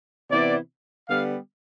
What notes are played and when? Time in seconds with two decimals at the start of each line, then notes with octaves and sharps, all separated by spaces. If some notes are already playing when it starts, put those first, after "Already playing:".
0.30 C3 E3 B3 E4 D5
1.09 D3 G3 B3 F5